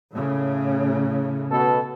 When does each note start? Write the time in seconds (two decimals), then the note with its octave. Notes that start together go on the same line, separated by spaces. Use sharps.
0.13 A2 C#3
1.51 B2 A4